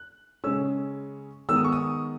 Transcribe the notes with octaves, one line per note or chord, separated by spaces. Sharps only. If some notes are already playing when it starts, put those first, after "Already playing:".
Already playing: F#6
C#3 G#3 C#4 E6
D#3 G#3 B3 E6
D#6
C#6
D#6